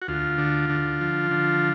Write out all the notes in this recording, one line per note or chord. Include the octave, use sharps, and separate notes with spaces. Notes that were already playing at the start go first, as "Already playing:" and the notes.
F#4
D2 F4
D3
D3
F3
D3